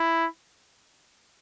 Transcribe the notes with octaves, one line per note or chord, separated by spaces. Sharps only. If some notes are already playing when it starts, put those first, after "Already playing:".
Already playing: E4